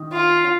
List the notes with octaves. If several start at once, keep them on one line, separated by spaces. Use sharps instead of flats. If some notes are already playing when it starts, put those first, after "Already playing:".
Already playing: D#3
F4